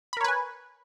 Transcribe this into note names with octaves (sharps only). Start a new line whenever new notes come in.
A#4 B4 C#5 G#5 B5